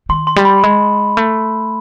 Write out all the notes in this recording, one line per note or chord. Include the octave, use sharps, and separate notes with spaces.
D#3 C6
C6
G3
B5
G#3
A3